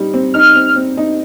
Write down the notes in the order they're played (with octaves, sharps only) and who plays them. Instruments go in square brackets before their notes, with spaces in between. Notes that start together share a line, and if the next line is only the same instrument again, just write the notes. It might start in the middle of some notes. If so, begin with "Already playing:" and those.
Already playing: [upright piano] G3 C4 D#4
C4
[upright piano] D#4 [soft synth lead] F6
[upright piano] C4
C4
D#4